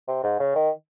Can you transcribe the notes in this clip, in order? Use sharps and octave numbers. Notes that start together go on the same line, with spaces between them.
C3
G#2
C#3
D#3